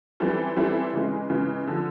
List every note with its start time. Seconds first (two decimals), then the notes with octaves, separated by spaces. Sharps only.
0.20 E3 G3 C4 E4 A4
0.56 E3 G3 C4 E4 A4
0.93 C#3 E3 G#3
1.30 C#3 E3 G#3
1.67 D3 F3